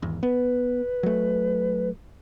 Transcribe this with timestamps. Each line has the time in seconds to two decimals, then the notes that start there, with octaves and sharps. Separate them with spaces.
0.02 G#1 E2
0.23 B3 B4
1.03 F#3 A3